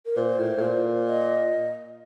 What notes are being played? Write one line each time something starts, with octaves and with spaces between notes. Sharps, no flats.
A#4
A#2 C5
A2
A2
A#2
D#5